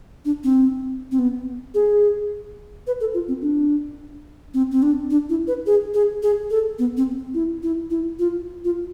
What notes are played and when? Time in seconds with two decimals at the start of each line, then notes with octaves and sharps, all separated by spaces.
0.25 D4
0.44 C4
1.12 C4
1.19 B3
1.74 G#4
2.87 B4
3.00 A4
3.14 F4
3.28 C4
3.42 D4
4.54 C4
4.71 C4
4.82 D4
5.11 D4
5.29 E4
5.48 B4
5.66 G#4
5.94 G#4
6.23 G#4
6.50 A4
6.79 B3
6.97 C4
7.34 E4
7.63 E4
7.90 E4
8.19 F4
8.65 F4